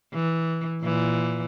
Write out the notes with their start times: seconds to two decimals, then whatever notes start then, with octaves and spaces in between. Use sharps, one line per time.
0.15 E3
0.81 A#2 E3